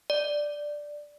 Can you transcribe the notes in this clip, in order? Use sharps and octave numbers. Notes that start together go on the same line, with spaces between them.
D5